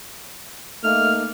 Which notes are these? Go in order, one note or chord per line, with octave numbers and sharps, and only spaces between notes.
A3 A#3 D#4 F6